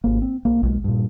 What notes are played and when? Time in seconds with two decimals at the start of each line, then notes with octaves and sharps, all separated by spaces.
0.04 G#1 A#3
0.22 C4
0.45 B1 A#3
0.63 B1 G#3
0.84 G2 A#2